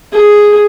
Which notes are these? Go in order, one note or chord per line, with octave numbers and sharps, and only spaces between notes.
G#4